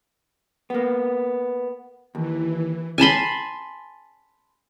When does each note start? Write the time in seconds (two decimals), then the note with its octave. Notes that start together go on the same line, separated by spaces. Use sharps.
0.70 A#3 B3
2.15 D#2 E3
2.98 G#5 A5 B5 C6